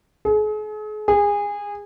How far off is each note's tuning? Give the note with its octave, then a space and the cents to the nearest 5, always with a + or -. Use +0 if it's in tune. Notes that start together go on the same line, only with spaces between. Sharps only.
G#4 +40
G#4 -25